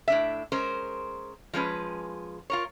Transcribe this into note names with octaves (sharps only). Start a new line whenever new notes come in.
A2 D4 E5
G#3 C#4 A#4 C5
F3 G#3 C#4 B4
F4 A#4 C#5